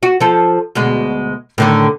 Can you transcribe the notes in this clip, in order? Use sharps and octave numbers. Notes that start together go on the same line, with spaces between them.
F#4
F3 A4
D2 B2 G#3
A2 D3 D#3